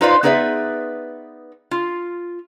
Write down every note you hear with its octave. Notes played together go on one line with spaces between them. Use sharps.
D#4 F4 B4 C5 D5 F5
B3 D#4 G#4 B4 D5 E5
F4